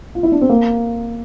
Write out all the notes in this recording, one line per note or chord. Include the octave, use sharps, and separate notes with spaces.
F4
E4
D4
C4
A#3